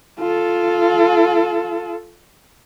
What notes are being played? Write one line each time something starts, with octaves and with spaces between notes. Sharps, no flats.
F4 A4